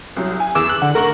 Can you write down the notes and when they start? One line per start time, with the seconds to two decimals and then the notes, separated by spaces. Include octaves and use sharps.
0.17 C2 F#3
0.40 G#5
0.55 E2 E3 D6 E6
0.69 F#6
0.82 D3 F#5
0.95 A3 A#4 C#6 F#7